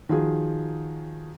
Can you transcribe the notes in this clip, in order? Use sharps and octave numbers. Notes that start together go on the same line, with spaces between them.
D#3 F3 F#4 G#4